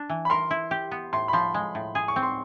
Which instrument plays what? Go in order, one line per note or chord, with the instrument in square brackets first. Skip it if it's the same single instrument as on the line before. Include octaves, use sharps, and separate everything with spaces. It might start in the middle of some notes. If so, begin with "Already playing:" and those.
Already playing: [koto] D4
E3
[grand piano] B5
[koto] A#4 [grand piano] C6
[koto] E4
G4
B3
[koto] A2 [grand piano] C6
[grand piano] B5
[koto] F3 [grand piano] C6
[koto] G#3
A2
G#4
[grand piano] C#6
[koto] C4
[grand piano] C6